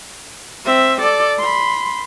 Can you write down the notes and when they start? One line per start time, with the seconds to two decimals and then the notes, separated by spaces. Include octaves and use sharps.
0.65 C4 E5
1.01 A4 D5
1.39 B5 C6